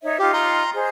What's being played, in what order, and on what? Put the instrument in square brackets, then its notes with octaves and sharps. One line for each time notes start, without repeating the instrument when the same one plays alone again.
[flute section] D#4 C#5 E5
[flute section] D#4 F4 [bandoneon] G4
[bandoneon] A#5 C6
[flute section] G#4 C5 D#5